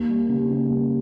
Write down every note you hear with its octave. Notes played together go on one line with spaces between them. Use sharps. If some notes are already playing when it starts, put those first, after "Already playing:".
Already playing: D#2
G3
C#3
C#3
G3